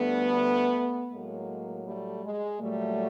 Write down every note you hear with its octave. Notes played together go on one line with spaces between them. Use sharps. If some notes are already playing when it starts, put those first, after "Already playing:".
Already playing: D2 D3 G3 A3 B3
A2 F#3 G#3 A#3
G3 A3
G#3
A#2 F#3 G3 A3